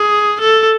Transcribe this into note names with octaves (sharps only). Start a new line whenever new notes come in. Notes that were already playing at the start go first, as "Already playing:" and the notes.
Already playing: G#4
A4